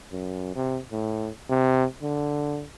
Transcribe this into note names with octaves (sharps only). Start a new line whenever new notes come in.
F#2
C3
A2
C3
D3